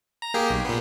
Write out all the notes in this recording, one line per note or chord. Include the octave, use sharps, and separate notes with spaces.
A#5
A#3 G4 G#4
B1
A#2 B3